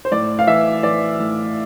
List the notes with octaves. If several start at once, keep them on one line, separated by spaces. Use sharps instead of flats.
C5
A2 D5
F5
E3 E5
E3 D5
A2